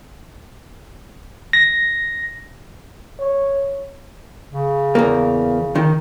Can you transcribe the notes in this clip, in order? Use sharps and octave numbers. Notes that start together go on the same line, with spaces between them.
A#6
C#5
C#3
E2 A#3
D#3